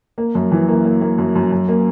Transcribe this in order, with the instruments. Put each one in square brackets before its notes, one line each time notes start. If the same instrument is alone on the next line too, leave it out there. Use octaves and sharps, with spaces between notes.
[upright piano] A#3
F#2
E3
A#3
A#3
A#3
F#2
F#2
F#2
A#3